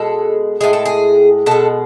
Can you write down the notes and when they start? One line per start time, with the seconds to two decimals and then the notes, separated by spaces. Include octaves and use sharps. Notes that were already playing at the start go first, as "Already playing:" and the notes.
Already playing: B2 G#3 A4
0.61 A2 G#3 G#4
0.73 A4
0.85 G#4
1.46 B2 G#3 A4